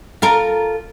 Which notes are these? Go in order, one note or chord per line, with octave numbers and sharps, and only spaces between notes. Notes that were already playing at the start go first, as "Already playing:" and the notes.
F4 A4 A#4